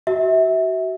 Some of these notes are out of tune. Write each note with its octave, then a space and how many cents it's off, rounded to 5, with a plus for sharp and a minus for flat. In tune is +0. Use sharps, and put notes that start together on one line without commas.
F#4 +30 E5 -25